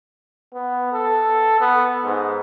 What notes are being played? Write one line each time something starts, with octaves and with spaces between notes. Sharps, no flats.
B3
A4
B3
G#2